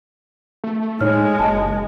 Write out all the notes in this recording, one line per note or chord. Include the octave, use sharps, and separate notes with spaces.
A3
A2 G#3 D#4 C#5 F6
F#1 D#5 A5